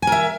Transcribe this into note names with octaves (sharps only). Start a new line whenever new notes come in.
A#4 E5 G#5